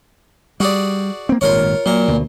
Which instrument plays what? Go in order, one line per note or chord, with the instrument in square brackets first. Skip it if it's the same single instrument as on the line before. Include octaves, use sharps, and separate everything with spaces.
[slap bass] G3 [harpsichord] F#4 G#4 D5
[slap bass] A#3 C4
[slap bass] G#1 G2 A#2 [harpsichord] F4 A#4 C#5
[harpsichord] A#2 A#4 [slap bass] F#3
[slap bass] D2 B2